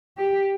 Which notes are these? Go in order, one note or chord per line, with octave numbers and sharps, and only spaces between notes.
G4